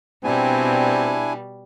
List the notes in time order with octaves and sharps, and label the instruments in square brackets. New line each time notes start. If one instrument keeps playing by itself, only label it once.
[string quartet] B2 G3 [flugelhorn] C4 [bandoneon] D4 E4 G#5